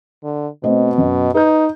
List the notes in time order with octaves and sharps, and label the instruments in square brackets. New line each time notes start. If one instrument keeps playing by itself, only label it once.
[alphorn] D3
[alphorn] B2 [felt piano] A3 C4 D#5
[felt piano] F#2 D#5
[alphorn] D#4 [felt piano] B4 G6